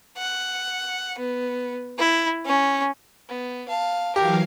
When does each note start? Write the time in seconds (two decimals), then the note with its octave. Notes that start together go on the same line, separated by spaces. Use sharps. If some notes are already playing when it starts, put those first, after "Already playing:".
0.18 F#5
1.20 B3
1.99 E4
2.47 C#4
3.29 B3
3.68 F5 A5
4.16 E3 F#3 G4 A#4 F5